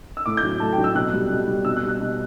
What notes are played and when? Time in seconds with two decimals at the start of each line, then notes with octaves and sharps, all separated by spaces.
0.17 E6
0.26 A2 D6
0.37 G6
0.43 F#3
0.60 A2 A5
0.73 G5
0.78 F#3
0.84 E6
0.95 B2 F#6
1.13 G3
1.30 B2
1.48 G3
1.65 B2 E6
1.76 F#6
1.83 G3
1.88 F#6
2.00 B2